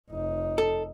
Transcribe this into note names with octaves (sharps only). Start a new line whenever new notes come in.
F1 D#4
A4